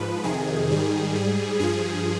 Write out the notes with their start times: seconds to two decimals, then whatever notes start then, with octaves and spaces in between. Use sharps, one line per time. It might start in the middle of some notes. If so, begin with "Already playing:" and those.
Already playing: G#2 F3 B4
0.24 F2 C3 D#3 G#4
0.70 G#2 D#3 G3
1.15 G#2 G3
1.60 G2 F3 G#4